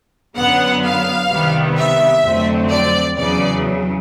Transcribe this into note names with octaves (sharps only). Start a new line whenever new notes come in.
F#2 D3 F#3 B3 F#5
F5
C2 C3 D#3 G3 B3
E5
F2 D3 F#3 A3 C4
D5
E2 C#3 F#3 D5